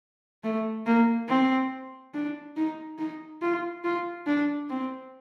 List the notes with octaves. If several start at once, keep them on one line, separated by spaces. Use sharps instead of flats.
A3
A#3
C4
D4
D#4
D#4
F4
F4
D4
C4